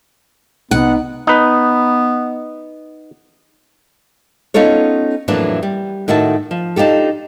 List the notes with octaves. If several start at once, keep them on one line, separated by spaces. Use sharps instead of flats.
C2 C3 B3 D#4 F#5
B3 D#4 B4
B3 C#4 D#4 F4 A4 C#5
F2 A2 E3 F#3 A#3 D4
G3
A2 D#3 F#4 E5 A5
F3
D4 D#4 F4 G4 A4